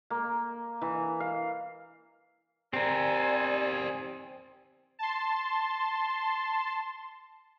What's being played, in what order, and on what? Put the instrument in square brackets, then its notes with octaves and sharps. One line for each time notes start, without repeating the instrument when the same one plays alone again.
[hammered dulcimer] A#3
E3
F5
[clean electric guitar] C4 [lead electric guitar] G4 A#4 [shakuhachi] D5 [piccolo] G#5
[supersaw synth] A5 C6